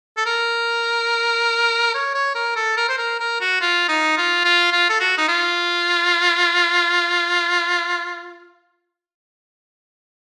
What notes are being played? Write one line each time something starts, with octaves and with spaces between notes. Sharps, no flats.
A4
A#4
C#5
C#5
A#4
A4
A#4
C5
A#4
A#4
F#4
F4
D#4
F4
F4
F4
A4
F#4
D#4
F4